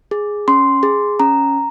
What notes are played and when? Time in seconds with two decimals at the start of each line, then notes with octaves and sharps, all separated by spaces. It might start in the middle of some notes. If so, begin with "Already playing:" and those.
0.11 G#4
0.48 C#4 C6
0.83 G#4
1.20 C#4 A#5